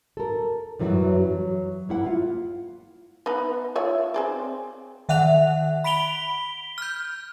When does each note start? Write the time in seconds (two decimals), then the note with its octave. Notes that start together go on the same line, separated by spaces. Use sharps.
0.17 A4 A#4
0.79 F#2 E3 F#3 G3 F#4
1.19 F#3
1.89 A#3 E4 F#5
2.06 F4 F5
3.26 B3 D#4 B4
3.76 F4 C#5 E5
4.14 C4 G#4 D5
5.09 D#3 E5 F#5 F#6 F7
5.84 B5 B6 D7 F7 G7
6.78 F6 G6